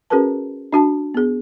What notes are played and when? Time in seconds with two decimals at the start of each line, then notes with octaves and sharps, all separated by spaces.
0.10 C#4 F#4 G#4 A#4 B4 A5
0.73 D4 F#4 A5
1.14 B3 G#4